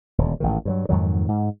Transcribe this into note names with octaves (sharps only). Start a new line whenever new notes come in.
D#1 D2
A1 G#2 D#3
G2 E3 F#3
F2 G#2 D#3 F#3
G#2